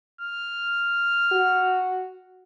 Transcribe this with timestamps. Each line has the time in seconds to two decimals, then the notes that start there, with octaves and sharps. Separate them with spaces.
0.21 F6
1.32 F#4